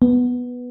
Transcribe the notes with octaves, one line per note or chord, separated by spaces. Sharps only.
B3